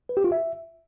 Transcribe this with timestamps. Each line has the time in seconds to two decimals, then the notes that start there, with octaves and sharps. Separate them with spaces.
0.09 B4
0.17 G4
0.24 F4
0.32 E5